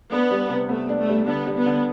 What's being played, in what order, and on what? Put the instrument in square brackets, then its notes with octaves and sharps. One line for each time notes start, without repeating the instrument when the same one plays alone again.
[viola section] B3 [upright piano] D4
[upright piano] G3
C3
[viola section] A3 [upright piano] B3
[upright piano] D4
[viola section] A3
[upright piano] G3
[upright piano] D3 [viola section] B3
[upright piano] G3
[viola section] B3
[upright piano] D3